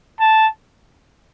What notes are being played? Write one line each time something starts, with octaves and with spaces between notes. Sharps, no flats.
A5